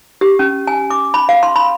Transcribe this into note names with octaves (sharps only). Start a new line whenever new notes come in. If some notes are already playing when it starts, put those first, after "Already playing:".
G4
C#4
G#5
D6
B5
F5
C6
B5